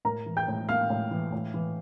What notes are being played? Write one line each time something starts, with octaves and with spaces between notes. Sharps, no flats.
A2 A#4 A#5
E3
G5 G6
A2
A#3 F5 F6
A2
E3
A2
E3